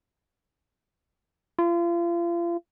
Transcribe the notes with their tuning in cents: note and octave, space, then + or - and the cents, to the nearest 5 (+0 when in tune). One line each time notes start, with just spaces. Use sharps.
F4 -35